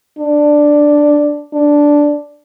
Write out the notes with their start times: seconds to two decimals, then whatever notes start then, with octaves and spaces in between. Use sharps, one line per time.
0.19 D4
1.53 D4